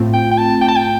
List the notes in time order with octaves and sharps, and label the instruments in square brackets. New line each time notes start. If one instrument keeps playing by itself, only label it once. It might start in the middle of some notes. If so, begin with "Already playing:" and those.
Already playing: [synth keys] A2 A3 C4 F4
[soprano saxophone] G5
G5
A5
G5
A5
G5